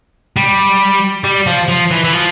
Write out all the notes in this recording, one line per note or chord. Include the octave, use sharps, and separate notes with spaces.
G3
G3
F3
F3
E3
E3
F3